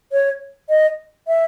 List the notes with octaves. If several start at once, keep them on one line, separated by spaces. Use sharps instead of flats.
C#5
D#5
E5